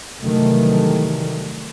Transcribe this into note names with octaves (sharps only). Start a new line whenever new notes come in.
C3 D#3 E3 F#3 G3 A3